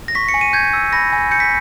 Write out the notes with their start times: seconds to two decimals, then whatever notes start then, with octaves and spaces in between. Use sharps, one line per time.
0.08 A#6
0.15 C#6 B6
0.28 C#7
0.34 G#5
0.41 D#7
0.53 G6 G#6
0.73 E6
0.93 B5 A#6
1.12 G#5
1.31 G6 C#7
1.40 B6